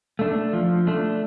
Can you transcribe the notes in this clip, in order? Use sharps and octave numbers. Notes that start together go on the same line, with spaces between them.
A3 D4
F3
A3 D4